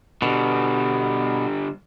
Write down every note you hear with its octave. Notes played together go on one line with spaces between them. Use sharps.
B2 D3 G3